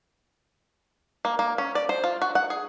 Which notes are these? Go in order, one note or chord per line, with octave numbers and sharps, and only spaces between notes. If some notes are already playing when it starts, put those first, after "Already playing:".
A#3
A#3
C#4
D5
C5
F4
F#4
F#5
G#4